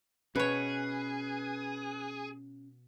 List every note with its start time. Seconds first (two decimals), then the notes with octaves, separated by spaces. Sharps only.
0.36 B2 C#4 G#4 B4 C#5